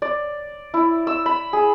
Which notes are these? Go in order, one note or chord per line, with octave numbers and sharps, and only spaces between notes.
D5
E4
E6
B5
G#4